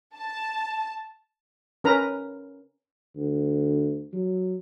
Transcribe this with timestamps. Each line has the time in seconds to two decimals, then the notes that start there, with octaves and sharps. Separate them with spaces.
0.15 A5
1.84 C#4 A#4 B4 A#5
3.16 D2
4.13 F#3